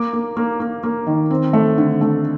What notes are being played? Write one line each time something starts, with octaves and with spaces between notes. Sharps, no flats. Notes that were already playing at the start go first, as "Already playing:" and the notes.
Already playing: A#3 D6
A#3
A#3
A#3
A#3
D#3
C4
A3
D3
A3